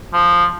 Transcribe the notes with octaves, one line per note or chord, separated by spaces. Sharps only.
F3